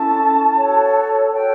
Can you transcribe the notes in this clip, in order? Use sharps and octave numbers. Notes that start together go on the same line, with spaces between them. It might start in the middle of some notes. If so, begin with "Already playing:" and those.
Already playing: C#4 E4 A4 A5
F#4 A4 C#5
F#4 A4 C#5 G5